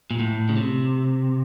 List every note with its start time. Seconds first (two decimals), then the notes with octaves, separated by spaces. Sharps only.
0.11 A#2
0.19 A2
0.49 C#3
0.56 C3